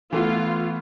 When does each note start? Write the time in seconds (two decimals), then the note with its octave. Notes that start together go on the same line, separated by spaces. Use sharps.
0.13 E3 A3 B3 F4